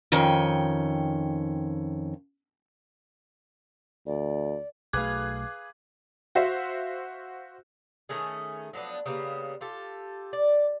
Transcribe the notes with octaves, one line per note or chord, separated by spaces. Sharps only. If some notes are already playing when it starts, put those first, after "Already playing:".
F2 D#3 C#4 G5
D2 D5
B1 A3 G#4 B4 F5 D6 F#6 G#6
F#4 C5 E5 F5
D#3 A3 C#4 G#4
F3 F#3 B3 D4
C#3 G3 A#3 B3
F4 G4 A4
D5